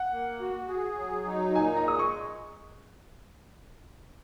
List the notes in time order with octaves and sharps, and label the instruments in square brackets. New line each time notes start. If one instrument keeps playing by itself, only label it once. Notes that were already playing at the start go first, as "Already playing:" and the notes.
Already playing: [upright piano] F#5
[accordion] A#3
F#4
G#4
F#3
D#4
[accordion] A#2 [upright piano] G#5
[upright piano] A#5
[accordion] G#3 [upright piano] D#6
[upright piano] C#6